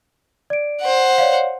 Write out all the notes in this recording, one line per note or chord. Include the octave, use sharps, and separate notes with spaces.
D5 D7
C5 F#5
C#5 D5 F5